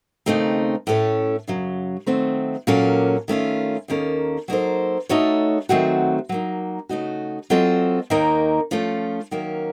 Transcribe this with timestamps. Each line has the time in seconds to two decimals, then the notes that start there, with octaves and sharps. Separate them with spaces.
0.26 D#2 C#3 A3 C4 D#4
0.87 A2 A3 C#4 A4 C#5
1.47 F#2 C#3 F#3
2.07 D#3 F#3 A3 C4
2.67 A#2 F#3 A#3 C#4 A4
3.28 D#3 A3 C#4 F4
3.88 D#2 D#3 A#3 C#4 A4
4.48 F#3 A#3 D#4 A4 C5
5.09 A3 D#4 F#4 A4 C#5
5.69 D#3 F#3 A3 C4 F#4
6.29 F#3 A#3 D#4
6.89 C#3 A3 D#4 F#4
7.50 F#3 C4 F4 A4 D#5
8.10 D#2 D#3 A#3 D#4 A#4
8.71 F3 A3 C#4 F4
9.31 D#3 F#3 A#3 C#4